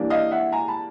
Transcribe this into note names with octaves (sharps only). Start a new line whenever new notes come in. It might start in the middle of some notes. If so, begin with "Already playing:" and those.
Already playing: E3 G3 A#3 D4
D#5 F5
E5 F#5
G#5 A#5
A5 B5